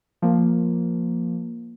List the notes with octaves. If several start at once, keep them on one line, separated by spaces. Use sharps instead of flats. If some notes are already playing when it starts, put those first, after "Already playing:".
F3 A#3